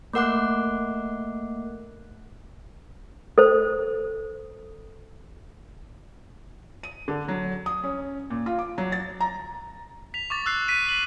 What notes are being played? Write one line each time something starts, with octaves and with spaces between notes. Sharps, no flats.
A3 A#3 A#4 F#5 D6 F#6
A4 C5
D#7
D3
F#3
D#6
C#4
A#2
F4
D6
F#3
A6
A#5
B6 F7
C#6 D6 A6
E6 F#6 C7
B6 D#7
F#7